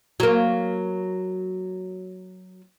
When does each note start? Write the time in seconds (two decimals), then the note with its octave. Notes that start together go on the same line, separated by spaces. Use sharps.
0.20 F#3 A#3